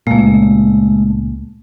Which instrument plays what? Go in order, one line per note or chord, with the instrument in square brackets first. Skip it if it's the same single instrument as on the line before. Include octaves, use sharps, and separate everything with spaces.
[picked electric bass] C#2 A#2 [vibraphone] G#3 A3